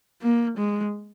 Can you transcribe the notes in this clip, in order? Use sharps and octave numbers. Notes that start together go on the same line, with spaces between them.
A#3
G#3